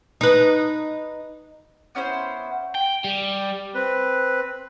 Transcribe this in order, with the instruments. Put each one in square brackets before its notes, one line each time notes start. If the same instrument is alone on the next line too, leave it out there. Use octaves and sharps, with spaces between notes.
[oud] D#4 B4
[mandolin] B3 C#4 E4 C5
[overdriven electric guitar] G5
G3
[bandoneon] C4 B4